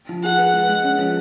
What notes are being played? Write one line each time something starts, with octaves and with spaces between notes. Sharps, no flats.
F3
G#4 F#5
B4
G#3
G#3
C#4
F3